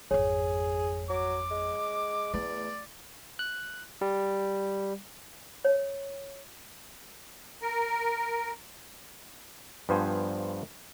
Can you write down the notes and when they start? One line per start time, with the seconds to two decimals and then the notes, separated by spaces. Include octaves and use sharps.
0.11 G#1 F2 G#4 C#5
1.09 F#3 D6
1.51 G#3
2.34 E2 A3 D5
3.39 F#6
4.01 G3
5.65 C#5
7.62 A#4
9.89 G2 F3 B3 C5 G#5